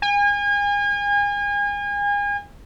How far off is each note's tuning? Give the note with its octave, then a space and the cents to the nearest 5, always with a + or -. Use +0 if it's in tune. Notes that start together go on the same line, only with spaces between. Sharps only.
G#5 -35